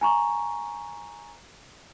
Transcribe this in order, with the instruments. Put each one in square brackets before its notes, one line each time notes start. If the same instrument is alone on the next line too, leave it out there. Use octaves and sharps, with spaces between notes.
[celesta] G#5 A#5 C#6